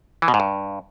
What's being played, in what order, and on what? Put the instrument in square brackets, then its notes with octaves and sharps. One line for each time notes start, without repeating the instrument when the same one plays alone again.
[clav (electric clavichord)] E3
B2
G#2
G2